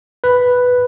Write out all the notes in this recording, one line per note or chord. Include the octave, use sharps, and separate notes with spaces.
B4